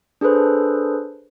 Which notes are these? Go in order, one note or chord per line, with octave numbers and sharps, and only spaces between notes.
D4 G#4 A4 B4 C5